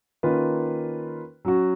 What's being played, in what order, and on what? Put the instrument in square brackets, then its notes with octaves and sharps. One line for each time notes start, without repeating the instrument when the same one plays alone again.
[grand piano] D#3 A#3 C#4 F4 B4
F#3 C#4 F#4